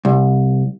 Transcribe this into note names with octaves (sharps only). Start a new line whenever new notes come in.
C2